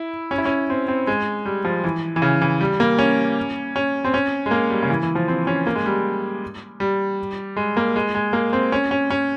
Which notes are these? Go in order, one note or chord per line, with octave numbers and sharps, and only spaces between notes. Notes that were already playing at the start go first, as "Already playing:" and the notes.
Already playing: E4
C#4
E4
C#4
C4
C4
G#3
G3
F3
E3
E3
C#3
E3
G3
A#3
C#4
C#4
C4
C#4
G#3
A#3
G3
C#3
E3
E3
F3
C4
C#4
A#3
G#3
G3
G3
G#3
A#3
G#3
G#3
A#3
C4
C#4
C#4
C#4